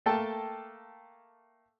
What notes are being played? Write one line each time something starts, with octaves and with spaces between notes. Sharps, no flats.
A3 A#3 A4 G5 A5